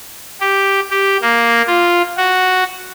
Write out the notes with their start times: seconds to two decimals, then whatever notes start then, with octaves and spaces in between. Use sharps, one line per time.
0.40 G4
0.90 G4
1.22 A#3
1.67 F4
2.17 F#4